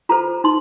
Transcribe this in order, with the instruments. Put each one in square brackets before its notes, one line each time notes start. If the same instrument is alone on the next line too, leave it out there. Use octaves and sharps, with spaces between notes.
[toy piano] F4 A4 C5 A#5
D#4 C6